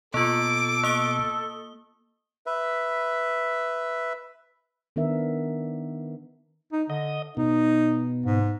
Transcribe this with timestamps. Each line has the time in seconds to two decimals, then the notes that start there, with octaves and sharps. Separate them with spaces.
0.14 B2 A#3 F4 A4 D6
0.83 A#3 D#6 G7
2.46 B4 E5
4.96 D#3 B3 D4 A#4 E5
6.72 D#4
6.90 D3 D#5
7.37 B2 D#4
8.26 G#2